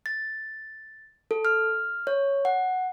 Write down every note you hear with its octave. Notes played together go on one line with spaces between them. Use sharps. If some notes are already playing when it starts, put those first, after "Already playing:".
A6
A4
F6
C#5
F#5